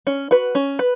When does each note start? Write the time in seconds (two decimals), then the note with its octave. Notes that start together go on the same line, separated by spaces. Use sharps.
0.07 C#4
0.31 F#4 B4
0.55 C#4
0.79 B4